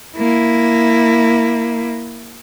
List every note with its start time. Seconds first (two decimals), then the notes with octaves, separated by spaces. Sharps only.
0.17 A#3 E4